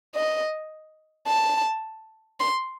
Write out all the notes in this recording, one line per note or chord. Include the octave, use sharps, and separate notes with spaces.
D#5
A5
C6